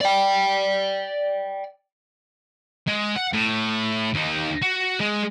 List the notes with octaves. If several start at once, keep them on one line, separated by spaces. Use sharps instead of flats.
D5 G5
G#3
F#5
A2
D#2 D#4
F#4
G#3